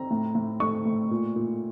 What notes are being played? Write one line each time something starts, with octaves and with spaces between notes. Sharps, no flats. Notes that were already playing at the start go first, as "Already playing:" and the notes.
Already playing: C4 A#5
A2
A2
A3 C#6
A2
A#2
A#2